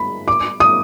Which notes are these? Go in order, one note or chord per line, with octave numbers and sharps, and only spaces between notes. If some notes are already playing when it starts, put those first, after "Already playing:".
Already playing: B5
D6
D#6